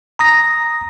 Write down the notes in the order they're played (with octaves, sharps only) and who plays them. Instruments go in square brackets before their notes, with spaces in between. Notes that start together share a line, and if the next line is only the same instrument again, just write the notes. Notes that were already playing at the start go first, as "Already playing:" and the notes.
[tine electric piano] A#5 D#6 A#6